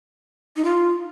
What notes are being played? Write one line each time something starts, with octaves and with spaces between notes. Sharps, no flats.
D#4
F4